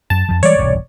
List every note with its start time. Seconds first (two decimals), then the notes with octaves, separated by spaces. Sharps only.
0.10 F#2 A5
0.29 F2 F3
0.43 E3 G3 G#3 C#5 D5
0.58 E1 C2 G#2